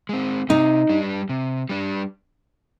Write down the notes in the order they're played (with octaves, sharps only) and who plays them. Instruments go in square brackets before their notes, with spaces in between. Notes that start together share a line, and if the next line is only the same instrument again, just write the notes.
[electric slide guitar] G#3 C4
[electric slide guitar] C3 [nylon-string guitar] D#4
[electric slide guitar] G3 D4
C3
G3 D4